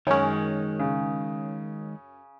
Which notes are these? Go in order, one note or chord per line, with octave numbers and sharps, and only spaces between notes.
F#2 D#3 G#3 C#4 C#5
C#3